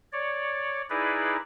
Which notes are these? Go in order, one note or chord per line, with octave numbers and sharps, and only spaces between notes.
C#5 D5
D#4 E4 G#4 B4 D5